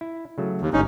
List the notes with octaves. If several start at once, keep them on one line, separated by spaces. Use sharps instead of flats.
E4
C#3 F#3 A3
D#2
G1 G#2 C#4 D#4